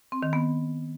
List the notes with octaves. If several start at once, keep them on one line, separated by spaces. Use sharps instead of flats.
C4
D#3
B3